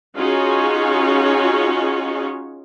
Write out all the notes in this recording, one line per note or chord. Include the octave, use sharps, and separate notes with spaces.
C#4 D#4 F4 F#4 G#4 C#5